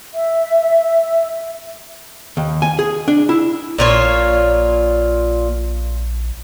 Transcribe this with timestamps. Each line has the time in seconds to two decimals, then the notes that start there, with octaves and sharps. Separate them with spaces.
0.14 E5
2.37 D#2
2.62 G#5
2.79 G#4
3.08 D4
3.29 E4
3.78 A#1 A#2 F4 C#5